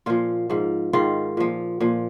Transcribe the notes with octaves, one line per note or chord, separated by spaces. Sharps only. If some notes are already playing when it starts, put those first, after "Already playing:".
A#2 F3 F4
G#2 F3
G#2 D#3 F4
A#2 F3
A#2 F3